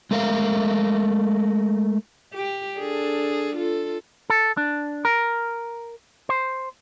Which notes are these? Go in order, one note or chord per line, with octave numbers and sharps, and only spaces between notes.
G#3 A3 A#4 E5 F5
G4
D4 G#4 A4
F4 A4
A4
D4
A#4
C5